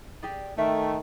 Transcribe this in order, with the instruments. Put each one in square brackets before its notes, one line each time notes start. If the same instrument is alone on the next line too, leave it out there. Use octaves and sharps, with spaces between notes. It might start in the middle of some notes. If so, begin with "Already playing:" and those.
[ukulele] G4 G#4 D5
[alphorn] D#3 [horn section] A3 [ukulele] A#4 E5 G5